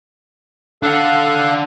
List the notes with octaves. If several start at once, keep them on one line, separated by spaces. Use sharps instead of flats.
D4 A4 F5 F#5 F#6